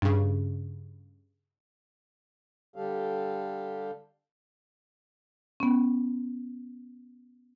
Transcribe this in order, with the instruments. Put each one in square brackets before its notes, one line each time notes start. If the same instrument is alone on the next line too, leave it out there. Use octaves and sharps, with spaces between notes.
[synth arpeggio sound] G2 C#3
[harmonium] D3 G3 G4 A4 F5
[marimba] B3 C#4